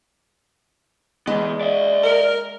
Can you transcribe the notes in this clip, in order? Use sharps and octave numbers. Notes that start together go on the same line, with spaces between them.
E3 G#3 B3
D5 E5
A#4